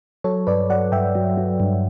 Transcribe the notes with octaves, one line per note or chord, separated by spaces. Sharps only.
F#3 A4 C#5
G2 B4 D5
F#3 D5 F#5
G2 E5 G5
F#3
F#3
G2